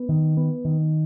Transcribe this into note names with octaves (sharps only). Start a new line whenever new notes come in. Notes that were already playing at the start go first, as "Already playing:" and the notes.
Already playing: B3
D#3
B3
D#3